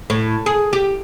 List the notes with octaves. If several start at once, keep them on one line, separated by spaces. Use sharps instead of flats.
A2
G#4
G4